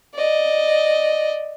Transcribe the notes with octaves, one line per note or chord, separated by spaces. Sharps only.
D5 D#5